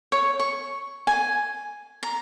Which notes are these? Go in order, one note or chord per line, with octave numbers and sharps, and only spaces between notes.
C#5
C#6
G#5
A#5